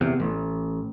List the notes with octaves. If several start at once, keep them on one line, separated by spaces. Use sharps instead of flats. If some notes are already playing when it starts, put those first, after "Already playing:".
E2 C3
A1